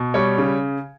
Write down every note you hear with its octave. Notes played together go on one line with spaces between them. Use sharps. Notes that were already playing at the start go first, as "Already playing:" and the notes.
Already playing: B2
G3 C#5
C#3